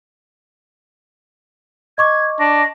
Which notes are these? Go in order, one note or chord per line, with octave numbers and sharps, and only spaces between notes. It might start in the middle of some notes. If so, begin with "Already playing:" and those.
D#5 C#6 D6 G#6
D4 A#6